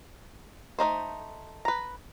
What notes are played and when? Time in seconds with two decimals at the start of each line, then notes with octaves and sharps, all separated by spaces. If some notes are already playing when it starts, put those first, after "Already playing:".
0.79 A3 C#4 D#4 C5
1.65 B4 A#5